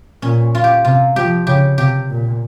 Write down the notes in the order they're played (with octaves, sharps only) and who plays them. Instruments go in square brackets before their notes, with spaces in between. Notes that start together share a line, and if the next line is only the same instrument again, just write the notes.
[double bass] A#2 [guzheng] C#4
[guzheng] F4
G4
[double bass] C3 [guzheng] F4
[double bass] F3 [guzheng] G4
[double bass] C#3 [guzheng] G4
[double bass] C3 [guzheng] G4
[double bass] A#2